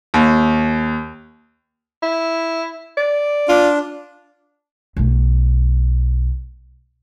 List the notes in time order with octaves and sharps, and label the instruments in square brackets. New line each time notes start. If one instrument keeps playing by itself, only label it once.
[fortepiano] D#2
[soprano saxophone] E4
D5
[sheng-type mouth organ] D4 [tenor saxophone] F4
[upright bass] B1 A3